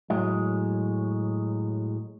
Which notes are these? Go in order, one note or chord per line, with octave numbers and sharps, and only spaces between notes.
A2 F#3 G#3